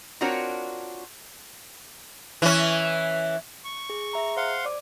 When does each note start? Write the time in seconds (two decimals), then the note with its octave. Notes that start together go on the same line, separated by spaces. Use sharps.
0.21 C4 D4 F4 F#4 A#4 C#5
2.42 E3 C#4
3.64 C#6
3.90 G#4
4.13 G#4 E5 A#5
4.37 C5 F5 F#5 C6
4.65 D5 D6